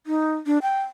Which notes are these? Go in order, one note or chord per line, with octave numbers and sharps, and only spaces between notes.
D#4
D4
G5